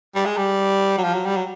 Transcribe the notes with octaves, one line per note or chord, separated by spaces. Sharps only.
G3
G#3
G3
F#3
F3
F#3
G3
F#3